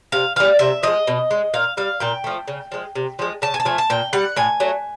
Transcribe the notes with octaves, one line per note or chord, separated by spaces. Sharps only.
C3 F5
E3 G3 F5
C3 E5
F3 G#3 D#5
B2
G#3
A#2 F5
G3 F5
A#2 G5
F3 A3
C#3
F3 G#3
C3
F3 G#3
C#3 A5
G#5
A5
F3 A3 G#5
A5
A#2 G5
G3 F#5
A2 G#5
F#3 A3